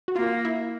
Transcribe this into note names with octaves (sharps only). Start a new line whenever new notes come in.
F#4
A#3 F4
E4